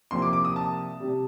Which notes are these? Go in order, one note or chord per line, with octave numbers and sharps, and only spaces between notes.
C2 C3 F3 A#3 C6
D6
D6
D#6
A5
C3 G3